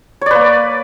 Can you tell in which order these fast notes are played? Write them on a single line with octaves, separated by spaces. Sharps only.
C#5 D5 B4 A#3